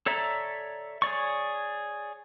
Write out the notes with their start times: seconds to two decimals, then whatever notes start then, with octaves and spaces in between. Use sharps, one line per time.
0.06 A4 C#5 D5 E5 A#5
1.02 G#4 C#5 D5 C#6